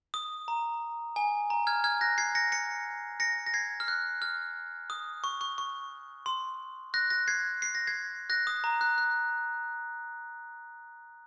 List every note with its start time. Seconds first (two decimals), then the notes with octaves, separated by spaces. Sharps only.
0.14 D#6
0.48 A#5
1.16 G#5
1.50 A#5
1.67 F6 G#6
1.84 F6 G#6
2.01 F#6 A#6
2.18 G#6 C7
2.35 A#6 C#7
2.52 A#6 C#7
3.20 A#6 C#7
3.47 A#6
3.54 G#6 C7
3.80 F6
3.88 F#6
4.22 F6
4.90 D#6
5.24 C#6
5.41 C#6
5.58 C#6
6.26 C6
6.94 F#6 A#6
7.10 F#6 A#6
7.28 G#6 C7
7.62 C7
7.75 A#6
7.87 G#6 C7
8.30 F#6 A#6
8.47 D#6
8.64 A#5
8.81 F#6
8.98 F#6